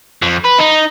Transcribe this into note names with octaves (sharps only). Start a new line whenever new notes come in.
F2
B4
D#4